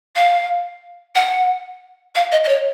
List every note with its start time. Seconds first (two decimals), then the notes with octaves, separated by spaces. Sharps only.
0.15 F5
1.15 F#5
2.15 F5
2.31 D#5
2.44 D#5
2.48 C#5